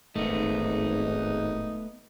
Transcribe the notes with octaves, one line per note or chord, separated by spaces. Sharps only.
D1 G#1 A3 B3 D#4